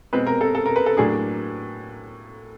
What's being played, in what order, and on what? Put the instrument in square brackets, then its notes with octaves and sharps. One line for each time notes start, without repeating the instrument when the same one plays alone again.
[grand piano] B2 G#3 C4 [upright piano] B4
[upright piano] A#4
A4
A4
A#4
B4
A4
[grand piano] A2 F#3 A#3 D4 [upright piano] G#4